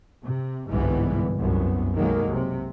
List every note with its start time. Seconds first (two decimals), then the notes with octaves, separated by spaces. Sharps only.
0.22 C3
0.69 G1 C2 G#2 E3 G3 B3
1.38 C2 F#2 B3
1.95 B1 D#3 F#3 G#3 A#3
2.30 C3